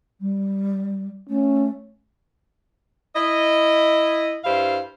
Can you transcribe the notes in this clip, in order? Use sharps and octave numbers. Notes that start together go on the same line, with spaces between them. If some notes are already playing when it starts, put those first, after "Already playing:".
G3
A3 C#4
E4 D#5
G2 G3 E4 C5 F5